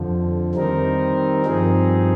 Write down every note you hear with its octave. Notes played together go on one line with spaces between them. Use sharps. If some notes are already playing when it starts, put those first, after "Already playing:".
Already playing: F2 D3 F3
D#3 G3 C4 D#4 A#4
G2 F3 C4 D#4 G#4